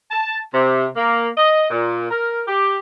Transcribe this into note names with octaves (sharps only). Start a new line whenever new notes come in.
A5
C3
A#3
D#5
A#2
A#4
G4